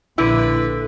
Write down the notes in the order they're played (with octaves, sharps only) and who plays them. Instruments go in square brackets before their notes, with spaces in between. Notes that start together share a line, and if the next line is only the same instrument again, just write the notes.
[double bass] A#1 [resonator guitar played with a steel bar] D3 [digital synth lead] E4 [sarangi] B4